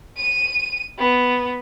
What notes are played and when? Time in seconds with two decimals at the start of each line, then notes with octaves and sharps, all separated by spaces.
0.17 D#7
0.99 B3